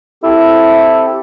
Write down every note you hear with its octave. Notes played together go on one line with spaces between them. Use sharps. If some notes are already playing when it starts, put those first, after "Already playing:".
C4 E4 G4 A4